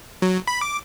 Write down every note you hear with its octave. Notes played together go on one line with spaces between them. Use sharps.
F#3
B5
D6